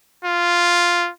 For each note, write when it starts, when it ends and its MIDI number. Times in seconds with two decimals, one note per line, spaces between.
0.25 1.11 65